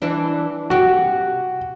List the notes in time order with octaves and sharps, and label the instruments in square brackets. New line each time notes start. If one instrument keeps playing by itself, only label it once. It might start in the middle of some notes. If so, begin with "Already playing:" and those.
[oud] E3 D4
[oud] C3 G4 [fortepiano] F#4